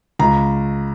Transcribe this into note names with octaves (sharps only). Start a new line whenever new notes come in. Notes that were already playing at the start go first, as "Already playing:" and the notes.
C#2 A#5